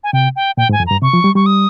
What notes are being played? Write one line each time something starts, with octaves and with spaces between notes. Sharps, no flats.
G#5
C3 G5
G5
A#2 G5
G#2
G#5
F2
G2 A#5
C3 C#6
F3
G3
G3 C#6
D#6